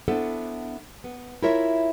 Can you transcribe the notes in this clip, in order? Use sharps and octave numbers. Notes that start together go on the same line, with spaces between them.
B3 D4 E4 A4 C5
B3
E4 F4 A#4 C#5 E5